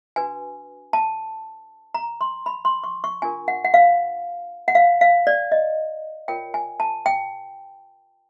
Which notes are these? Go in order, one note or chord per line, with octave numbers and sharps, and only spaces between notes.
D4 F#4 B4 G#5
A5
A#5
C6
B5
C6
C#6
C#6
D4 F4 A#4 G#5
F#5
F#5
F5
F#5
F5
F5
D5
D#5
F4 A#4 C#5 G5
G#5
A5
G5